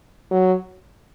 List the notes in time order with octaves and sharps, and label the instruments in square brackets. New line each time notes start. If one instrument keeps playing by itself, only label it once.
[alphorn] F#3